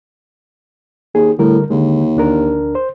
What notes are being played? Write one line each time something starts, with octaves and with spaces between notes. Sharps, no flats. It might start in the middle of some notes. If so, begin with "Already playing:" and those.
D#2 G#4
A2 D3 G3 A#4
D#2 D3 G#3
D2 D4 A#4
C5